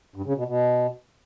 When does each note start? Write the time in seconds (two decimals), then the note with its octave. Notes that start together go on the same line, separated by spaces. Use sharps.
0.16 G2
0.26 C#3
0.36 B2
0.46 B2